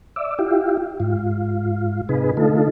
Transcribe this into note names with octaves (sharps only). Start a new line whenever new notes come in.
D5 E5
E4 F4 G4
G#2 F4
C3 D#4 G#4 B4
D3 A3 D#4 F4 A4